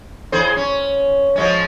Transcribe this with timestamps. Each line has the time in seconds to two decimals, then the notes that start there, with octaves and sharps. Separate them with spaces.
0.32 E2 G#4 C5
0.57 C#4
1.36 F3 G#3 C#4